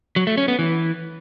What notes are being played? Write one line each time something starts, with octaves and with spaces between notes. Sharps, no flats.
F#3
A3
C#4
B3
E3